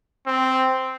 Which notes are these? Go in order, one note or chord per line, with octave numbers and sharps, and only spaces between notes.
C4